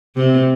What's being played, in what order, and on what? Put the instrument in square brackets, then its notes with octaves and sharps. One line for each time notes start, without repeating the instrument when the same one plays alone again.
[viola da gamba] C3